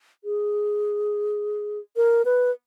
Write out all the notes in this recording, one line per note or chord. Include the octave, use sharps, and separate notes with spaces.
G#4
A#4
B4